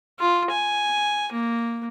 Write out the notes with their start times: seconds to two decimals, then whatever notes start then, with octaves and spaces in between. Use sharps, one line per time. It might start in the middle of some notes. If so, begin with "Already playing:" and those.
0.19 F4
0.51 G#5
1.32 A#3